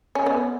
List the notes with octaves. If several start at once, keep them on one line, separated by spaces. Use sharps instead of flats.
C#4
B3